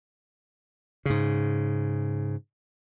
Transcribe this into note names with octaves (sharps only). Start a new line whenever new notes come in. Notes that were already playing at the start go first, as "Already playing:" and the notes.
G#2 C#3